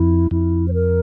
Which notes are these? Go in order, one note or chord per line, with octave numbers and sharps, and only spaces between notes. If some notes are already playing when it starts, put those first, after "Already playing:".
Already playing: F2 E4
F2 E4
C5
A#4